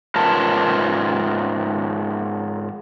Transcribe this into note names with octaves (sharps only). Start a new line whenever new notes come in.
G#2 C#4 F4 A#4 B4 A5